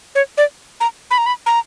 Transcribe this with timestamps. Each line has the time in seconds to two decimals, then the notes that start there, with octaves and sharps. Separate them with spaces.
0.15 C#5
0.37 D5
0.80 A#5
1.11 B5
1.18 A#5
1.26 B5
1.46 A#5